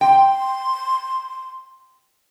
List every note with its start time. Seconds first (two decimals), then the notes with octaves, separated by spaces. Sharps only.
0.01 G5 C6